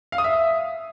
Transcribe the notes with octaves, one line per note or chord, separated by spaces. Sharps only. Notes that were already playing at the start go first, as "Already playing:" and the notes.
F5
D#6
E5